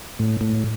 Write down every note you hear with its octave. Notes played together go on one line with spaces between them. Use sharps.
A2
A2